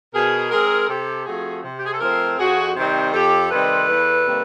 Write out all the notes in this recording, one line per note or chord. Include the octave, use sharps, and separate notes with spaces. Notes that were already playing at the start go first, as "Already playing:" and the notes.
B2 G#4 A#4
G#3 C4 G#4 A#4
C3 G4 A4
F3 A3 C4 F#4 G#4
C3
G4
G#4
A4
F3 A3 C4 G#4 A#4
F2 F#4 G#4
C3 D#3 G3 C4
F2 G4 A4
C3 D#3 G3 C4 A4 B4
E2
C3 D#3 G3 A#3